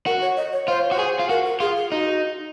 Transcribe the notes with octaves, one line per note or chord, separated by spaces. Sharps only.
F#4 A#4
C#5
D#5
C#5
F4 C5
C#5
F#4 C5
G#4
F4
F#4 A#4
A#4
F4 G#4
G#4
D#4 F#4